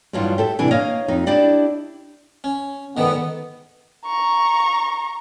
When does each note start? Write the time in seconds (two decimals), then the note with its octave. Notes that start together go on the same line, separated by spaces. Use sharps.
0.13 G2 E3 F#3 D4 D#4 F4
0.38 G4 A4 E5
0.59 C3 E3 G3 D4 G#5
0.71 A#3 C#5 D#5 F5
1.08 F2 D#4
1.26 D4 E4 G4 D5 D#5
2.44 C#4
2.97 G#2 D3 D#3 B3
4.05 A#5 C#6